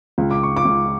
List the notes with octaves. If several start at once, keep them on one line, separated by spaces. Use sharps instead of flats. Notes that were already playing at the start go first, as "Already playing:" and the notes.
C#2
D6
C#6
D6
C#2